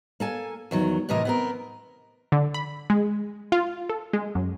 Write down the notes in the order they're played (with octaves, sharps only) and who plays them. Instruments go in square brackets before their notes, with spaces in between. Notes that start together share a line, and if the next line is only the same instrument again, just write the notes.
[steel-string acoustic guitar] A#3 A4 G#5
E2 D#3 F#3
A2 C3 E3 A#4 D#5
B3 C4 A#4
[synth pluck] D3
B5
G#3
F4
A4
G#3
F#2